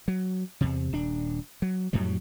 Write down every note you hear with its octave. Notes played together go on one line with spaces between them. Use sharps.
F#3
E2 C3
D#1 D4
F#3
F2 A2 F#3 G3